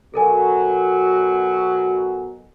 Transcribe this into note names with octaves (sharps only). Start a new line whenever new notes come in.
B2 F#3 A4 A#4 G#5